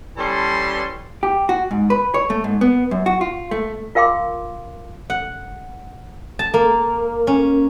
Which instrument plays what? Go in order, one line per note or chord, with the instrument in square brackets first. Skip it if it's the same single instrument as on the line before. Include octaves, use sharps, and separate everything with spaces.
[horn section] E3 G3 C#4 A4 A5 C6
[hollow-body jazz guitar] G4
F#4
G#2
B4
C#5
A3
G#2
B3
F#2
F#4
F4
A3
[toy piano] F4 A#4 F5 G5 C6 D6
[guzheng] F#5
A5
A#3
C#4